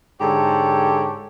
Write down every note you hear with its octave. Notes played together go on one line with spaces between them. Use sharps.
G#2 D3 G4 A4 C#5